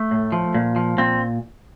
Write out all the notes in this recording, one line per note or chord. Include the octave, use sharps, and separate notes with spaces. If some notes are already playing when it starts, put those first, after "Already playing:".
Already playing: A3
A2
F3
A#2
F3
A#2 C4